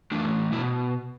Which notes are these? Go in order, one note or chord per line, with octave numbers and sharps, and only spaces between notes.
E3 A3 D4
B2 E4